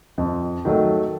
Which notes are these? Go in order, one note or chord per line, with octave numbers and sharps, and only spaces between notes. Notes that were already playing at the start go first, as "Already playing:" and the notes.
F2
D#3 F#3 A3